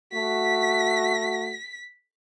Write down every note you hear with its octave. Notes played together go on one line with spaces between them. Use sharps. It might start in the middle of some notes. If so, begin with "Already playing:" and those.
A3 F#4 B6